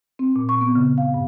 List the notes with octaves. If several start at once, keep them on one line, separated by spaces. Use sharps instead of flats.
C4
A#2
C#6
B3
C#3
F5
G2